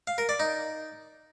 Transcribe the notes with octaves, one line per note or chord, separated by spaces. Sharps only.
F5
A#4
D5
D#4